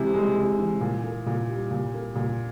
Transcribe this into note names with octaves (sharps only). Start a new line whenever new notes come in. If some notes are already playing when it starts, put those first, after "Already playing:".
Already playing: C3 E3 G#3
G#3
C3
E3
A#2
A#3
A#2
G3
A#2
A#3
A#2